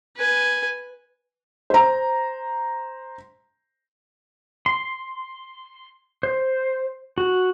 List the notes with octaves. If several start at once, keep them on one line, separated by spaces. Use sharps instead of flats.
B4 G#5
C5 A#5
C6
C5
F#4